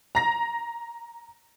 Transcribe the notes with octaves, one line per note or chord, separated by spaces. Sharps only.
A#5 A#6